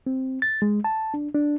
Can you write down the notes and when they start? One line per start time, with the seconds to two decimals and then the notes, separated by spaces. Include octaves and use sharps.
0.07 C4
0.42 A6
0.62 G#3
0.84 A5
1.14 D4
1.35 D4